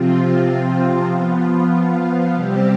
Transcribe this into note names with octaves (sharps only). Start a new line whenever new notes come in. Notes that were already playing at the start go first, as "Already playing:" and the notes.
Already playing: C3 F3 C4 F4
F3 B3 F4
C3 G3 C4 G4